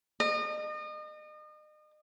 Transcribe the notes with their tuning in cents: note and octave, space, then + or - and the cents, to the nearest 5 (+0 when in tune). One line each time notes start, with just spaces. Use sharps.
D#5 -35